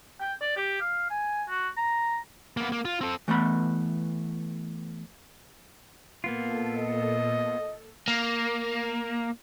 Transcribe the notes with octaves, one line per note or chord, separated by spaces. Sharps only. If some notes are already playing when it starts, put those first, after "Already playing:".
G5
D5
G4
F5
G#5
F#4
A#5
A#3 B3
A#3
F4
C4 A4
E3 A3 B3 B5
A#2 A#3 B3 F4 A4
D#5
A#3